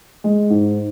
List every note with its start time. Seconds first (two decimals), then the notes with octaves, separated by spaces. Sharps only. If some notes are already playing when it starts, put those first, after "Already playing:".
0.24 G#3
0.50 G#2